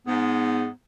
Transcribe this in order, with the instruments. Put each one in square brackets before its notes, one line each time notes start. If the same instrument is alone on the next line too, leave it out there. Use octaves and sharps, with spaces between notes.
[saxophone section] G#2 [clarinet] B3